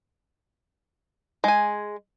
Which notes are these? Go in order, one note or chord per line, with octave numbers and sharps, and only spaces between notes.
G#3 G#5